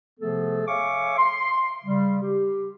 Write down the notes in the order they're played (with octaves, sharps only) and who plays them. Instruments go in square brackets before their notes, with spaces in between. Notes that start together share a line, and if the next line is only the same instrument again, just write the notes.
[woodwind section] C3 F3 A3 B3 G#4 A4
C#5 E5 F5 G#5 C#6 D6
C6
C#3 G3
G4